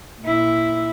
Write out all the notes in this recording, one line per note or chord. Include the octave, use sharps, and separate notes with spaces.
A#2 E4